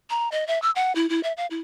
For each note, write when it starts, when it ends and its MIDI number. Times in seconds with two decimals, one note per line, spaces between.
0.10 0.29 82
0.32 0.46 75
0.47 0.61 76
0.62 0.71 88
0.76 0.92 78
0.95 1.08 64
1.10 1.23 64
1.23 1.33 76
1.37 1.46 77
1.51 1.61 64